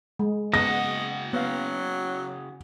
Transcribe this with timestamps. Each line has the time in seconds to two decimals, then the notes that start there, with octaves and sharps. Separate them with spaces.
0.19 G#3
0.54 C#3 B3 F#4 D#5 F#5 A#6
1.33 F#3 B3 F5